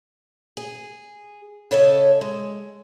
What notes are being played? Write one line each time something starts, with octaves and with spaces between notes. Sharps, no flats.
G#4
C#3 A4 C#5 D#5 E5
G#3